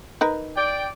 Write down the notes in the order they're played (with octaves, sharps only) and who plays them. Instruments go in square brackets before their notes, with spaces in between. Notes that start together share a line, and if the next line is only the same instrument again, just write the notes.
[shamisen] D#4 A#4 B4
[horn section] D5 G5